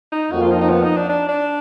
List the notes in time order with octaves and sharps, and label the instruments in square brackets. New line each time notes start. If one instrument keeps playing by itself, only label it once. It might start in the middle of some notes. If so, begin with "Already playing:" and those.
[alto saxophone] D#4
[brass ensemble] F2 F3 A#3 [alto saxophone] F#4
[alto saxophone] F4
D#4
D#4
B3
D#4
D4
D4
D4